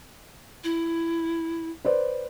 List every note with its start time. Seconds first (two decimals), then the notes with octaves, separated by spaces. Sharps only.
0.64 E4
1.85 B4 C5 D5